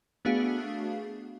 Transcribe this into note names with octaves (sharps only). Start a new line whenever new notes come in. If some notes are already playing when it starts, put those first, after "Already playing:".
A3 B3 D4 F#4 G#4 F5